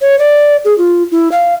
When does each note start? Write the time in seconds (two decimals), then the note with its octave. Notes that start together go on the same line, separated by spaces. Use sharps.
0.01 C#5
0.19 D5
0.65 G#4
0.78 F4
1.11 E4
1.32 F5